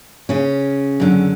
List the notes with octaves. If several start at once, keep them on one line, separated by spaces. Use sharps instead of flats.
C#3 C#4
F#2 D3